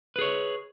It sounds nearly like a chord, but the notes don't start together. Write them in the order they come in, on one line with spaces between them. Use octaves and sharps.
B4 G#4 C#5